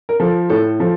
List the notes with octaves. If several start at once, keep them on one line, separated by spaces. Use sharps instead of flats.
A#4
F3 A4
A2 A4
F3 A4